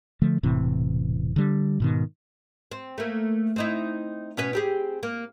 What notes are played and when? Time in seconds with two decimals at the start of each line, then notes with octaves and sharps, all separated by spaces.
0.22 D3 F3 A3
0.43 E1 A2 C3 E3
1.36 D3 G3
1.80 G#2 B2 D#3
2.71 C4
2.98 A3 A#3
3.56 C4 D#4 E4
4.37 B2 C#4 B4
4.53 C4 G4 G#4
5.03 A#3